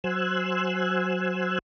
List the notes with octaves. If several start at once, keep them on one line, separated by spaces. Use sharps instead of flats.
F#3 C5 G#5 E6 F#6